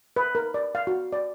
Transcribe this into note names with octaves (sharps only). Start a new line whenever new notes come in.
B4
A#4
D5
F5
F#4
D5